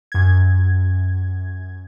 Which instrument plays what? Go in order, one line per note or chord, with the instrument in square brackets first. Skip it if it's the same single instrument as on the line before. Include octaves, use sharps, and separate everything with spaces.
[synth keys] F#2 G#6